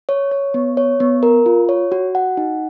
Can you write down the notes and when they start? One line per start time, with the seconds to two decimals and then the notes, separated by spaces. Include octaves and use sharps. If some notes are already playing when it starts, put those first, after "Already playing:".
0.09 C#5
0.31 C#5
0.54 B3
0.77 C#5
1.00 B3
1.23 A#4
1.46 F4
1.69 C#5
1.92 F#4
2.15 F#5
2.37 D#4